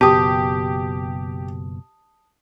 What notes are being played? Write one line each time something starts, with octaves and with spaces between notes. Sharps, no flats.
F#1 B2 G4 A5 D#6